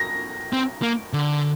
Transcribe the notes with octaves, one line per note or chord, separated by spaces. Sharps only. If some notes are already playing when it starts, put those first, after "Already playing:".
Already playing: A#6
C4
A#3
D3